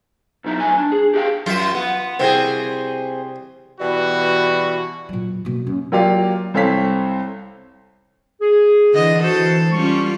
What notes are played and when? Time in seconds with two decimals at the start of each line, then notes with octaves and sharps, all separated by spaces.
0.44 B2 F#3 D#4 E4
0.60 D2 F#3 G#5
0.78 D4
0.92 G#4
1.14 G4 G#4 D#5 F5 G5
1.46 F#2 F4 E5
1.75 B3
2.20 C2 C3 C4 G#4
3.80 B2 E3 G3 F#4
5.09 A#2 F#3
5.45 B2 A#3
5.67 F#2
5.92 F#3 A#3 F4 G4 D5 F5
6.54 C2 C4 A4 C#5 F5 B6
8.41 G#4
8.93 D3 E3 D#5
9.23 E3 F#4 A4 C5
9.72 G3 C#4 F4 C#6